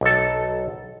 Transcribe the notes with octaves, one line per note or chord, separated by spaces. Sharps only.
B1 A4